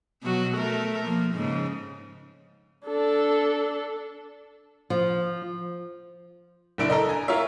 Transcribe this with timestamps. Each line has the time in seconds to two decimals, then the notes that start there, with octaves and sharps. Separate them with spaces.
0.23 B2 F#3 F#4
0.55 A3 A#4
1.05 F3 A#3
1.34 G#2 C#3
2.87 D4 A4
4.90 F3
6.78 F#1 A#2 D4 E4 D7
6.90 A4 A#4 D#5
7.09 G#5 A#5
7.28 E4 F4 A#4 C#5 E5